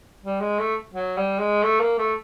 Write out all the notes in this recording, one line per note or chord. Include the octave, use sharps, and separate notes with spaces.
G3
G#3
A3
F#3
G3
G#3
A3
A#3
A3